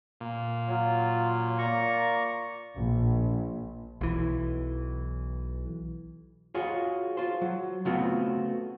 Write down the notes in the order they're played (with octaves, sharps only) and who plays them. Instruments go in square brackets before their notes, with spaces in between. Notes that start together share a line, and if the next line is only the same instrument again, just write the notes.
[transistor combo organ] A#2
[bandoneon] F#3 [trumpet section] F4
[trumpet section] A#3 F4 D5 [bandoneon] A#5 C#6
[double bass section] A#1
[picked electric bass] B1 E3
[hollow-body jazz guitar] F4 F#4 G#4 C#5
F4 C5
F#3
C#3 A3 B3 C4 F4 F#4